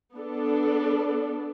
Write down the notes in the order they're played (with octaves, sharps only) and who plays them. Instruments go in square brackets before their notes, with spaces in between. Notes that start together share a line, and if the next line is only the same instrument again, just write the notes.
[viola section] B3 D4 A4